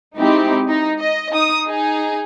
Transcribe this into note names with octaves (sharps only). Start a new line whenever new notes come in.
G#3 C4 D#4 E4 G4
D#4
D#5
D#4 D#6
D#4 G#4